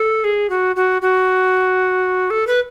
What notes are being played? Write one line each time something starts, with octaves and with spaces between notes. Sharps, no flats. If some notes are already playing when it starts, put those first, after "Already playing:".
Already playing: A4
G#4
F#4
F#4
F#4
A4
B4